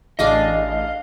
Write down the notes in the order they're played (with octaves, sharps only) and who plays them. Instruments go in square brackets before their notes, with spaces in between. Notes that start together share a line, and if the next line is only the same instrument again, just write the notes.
[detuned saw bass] A1 [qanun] D4 G#4 D6 [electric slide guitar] D#5 [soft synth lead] F5